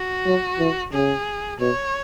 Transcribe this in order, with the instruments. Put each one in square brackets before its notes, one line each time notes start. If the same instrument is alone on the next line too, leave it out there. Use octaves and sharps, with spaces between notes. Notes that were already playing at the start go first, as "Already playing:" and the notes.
Already playing: [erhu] F#4
[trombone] F#3
E3
[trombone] C#3 [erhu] G#4
[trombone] B2 [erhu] C#5